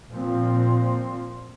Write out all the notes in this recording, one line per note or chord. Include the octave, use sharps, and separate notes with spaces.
A#2 F3 C4